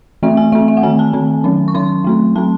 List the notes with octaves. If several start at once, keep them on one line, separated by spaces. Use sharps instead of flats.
E3 A3 C4 E5
G#5
E3 A3 C4 E5
E5
F#5
D#3 A3 C4 G#5
A5
D#3 A3 C4
D#3 F#3 C#4
C#6
D#3 F#3 C#4 C6
F#3 A3 C4
F#3 A3 C4 A5